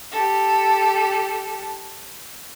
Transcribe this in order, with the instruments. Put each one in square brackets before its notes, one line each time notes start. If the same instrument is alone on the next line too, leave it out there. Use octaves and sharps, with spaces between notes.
[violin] G4 A4